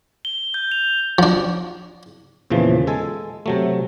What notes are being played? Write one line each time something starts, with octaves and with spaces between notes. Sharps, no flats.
G7
G6
F7
F3 D4
E2 A#2 C#3 E3 F3
G#3 A4 G#5
C3 F#3 A3